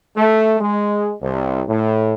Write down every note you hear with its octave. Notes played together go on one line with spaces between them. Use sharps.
A3
G#3
C2
A2